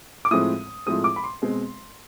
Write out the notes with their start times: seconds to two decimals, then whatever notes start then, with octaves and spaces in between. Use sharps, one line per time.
0.25 D6
0.31 A2 F3 G#3 C4 D#6
0.86 A2 F3 G#3 C4 D#6
1.04 D6
1.16 B5
1.24 C6
1.42 B2 G#3 C4